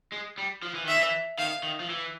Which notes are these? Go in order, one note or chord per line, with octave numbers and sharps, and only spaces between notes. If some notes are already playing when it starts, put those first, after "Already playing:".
G#3
G3
F3
E3
D#3 E5
E3
D#3 F5
D#3
F3
E3